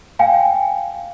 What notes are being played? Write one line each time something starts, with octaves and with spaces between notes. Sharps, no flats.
F5 G5 G#5